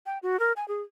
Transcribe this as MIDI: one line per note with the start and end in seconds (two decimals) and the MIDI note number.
0.06 0.18 79
0.23 0.39 66
0.40 0.53 70
0.56 0.67 80
0.68 0.82 68